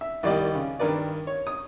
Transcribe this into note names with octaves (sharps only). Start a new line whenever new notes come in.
E5
C2 D#3 G3 D5 D#5
C#3
G2 D#3 A#4 B4 D5
C#5
D#6